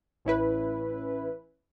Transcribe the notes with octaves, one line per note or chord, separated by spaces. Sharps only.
A1 C#4 E4 B4